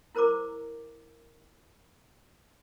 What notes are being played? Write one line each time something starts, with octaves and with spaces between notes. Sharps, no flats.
E4 A#4 C5 A#5 D6